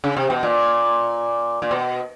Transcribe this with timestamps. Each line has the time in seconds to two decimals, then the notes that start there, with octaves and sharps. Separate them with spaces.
0.04 C#3
0.17 C3
0.30 B2
0.43 A#2
1.62 A#2
1.71 B2